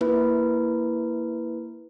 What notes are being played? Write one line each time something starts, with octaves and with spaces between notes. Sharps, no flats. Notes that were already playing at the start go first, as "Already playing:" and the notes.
A#3 E4 B4